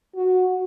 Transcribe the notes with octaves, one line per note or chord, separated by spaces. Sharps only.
F#4